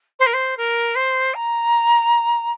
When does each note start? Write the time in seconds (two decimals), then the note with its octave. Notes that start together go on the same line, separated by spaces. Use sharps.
0.19 C5
0.26 A#4
0.33 C5
0.57 A#4
0.95 C5
1.34 A#5